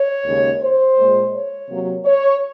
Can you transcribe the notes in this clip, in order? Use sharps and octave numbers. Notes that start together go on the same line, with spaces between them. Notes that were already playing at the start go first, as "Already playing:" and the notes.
Already playing: C#5
D#2 C#3 G#3
C5
A#2 G#3
C#5
C3 F#3 A#3
C#5